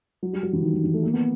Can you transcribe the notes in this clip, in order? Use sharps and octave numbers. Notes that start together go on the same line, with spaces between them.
F#3
G3
F#3
E3
D#3
E3
E3
A3
A#3
B3